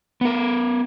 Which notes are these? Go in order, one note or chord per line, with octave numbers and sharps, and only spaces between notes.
B3 A#4